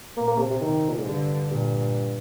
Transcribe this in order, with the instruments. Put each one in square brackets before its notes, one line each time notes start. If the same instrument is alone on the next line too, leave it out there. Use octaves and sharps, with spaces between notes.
[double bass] A#2 [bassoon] A#3
[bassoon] A#3
C3
C3
[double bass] C3 [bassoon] D#3
[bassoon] A#2
G#2
[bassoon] G2 [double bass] D3
[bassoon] G2 [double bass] A#2